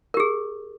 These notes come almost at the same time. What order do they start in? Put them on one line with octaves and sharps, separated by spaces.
A#4 G4 G#4